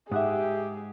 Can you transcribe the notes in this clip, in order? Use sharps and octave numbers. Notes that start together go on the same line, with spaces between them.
G#2 G4 G#4 E5 F#5 D#6